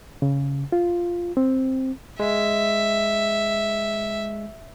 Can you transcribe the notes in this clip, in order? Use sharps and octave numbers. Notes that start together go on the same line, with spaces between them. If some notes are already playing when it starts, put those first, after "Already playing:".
C#3
F4
C4
G#3 E5